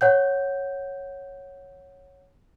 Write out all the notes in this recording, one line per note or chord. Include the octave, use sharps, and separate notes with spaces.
C#5 F#5 G6